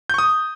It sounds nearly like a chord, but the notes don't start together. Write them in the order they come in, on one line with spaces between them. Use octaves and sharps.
G6 C#6 D#6